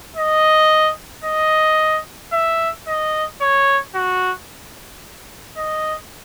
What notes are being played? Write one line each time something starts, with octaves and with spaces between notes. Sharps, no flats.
D#5
D#5
E5
D#5
C#5
F#4
D#5